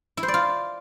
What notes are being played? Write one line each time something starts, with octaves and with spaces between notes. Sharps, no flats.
E4
C5
D5
F4